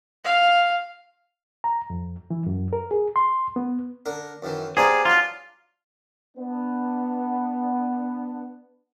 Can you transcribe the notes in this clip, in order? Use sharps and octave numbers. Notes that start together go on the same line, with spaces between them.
F5
A#5
F2
E3
F#2
A#4
G#4
C6
B3
D3 A#4
F#2 D#3 E3
B3 G4 G#4 C5 D5 F5 A#5
F#3 D4 F4
B3 D4